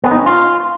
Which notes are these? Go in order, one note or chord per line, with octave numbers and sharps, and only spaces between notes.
B3
D#4
C#4
F4